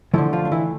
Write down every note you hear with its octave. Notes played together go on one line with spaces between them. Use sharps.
D3 E3 F3 A3 E4
F3 F4
D4
E3 E4